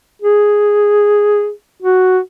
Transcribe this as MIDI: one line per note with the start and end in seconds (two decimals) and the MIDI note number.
0.22 1.51 68
1.83 2.19 66